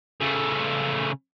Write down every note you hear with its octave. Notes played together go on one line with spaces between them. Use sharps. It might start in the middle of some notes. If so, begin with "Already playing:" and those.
C#3 A3